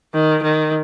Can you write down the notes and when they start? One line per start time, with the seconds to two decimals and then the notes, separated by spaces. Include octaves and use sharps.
0.14 D#3
0.43 D#3